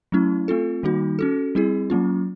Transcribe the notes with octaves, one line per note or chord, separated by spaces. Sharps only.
F#3 A3 C#4 E4
A3 C4 F4 A4
D#3 G3 A#3 D#4 F#4
C#4 F#4 A4
G3 C4 E4 G#4
F#3 A#3 C#4 F4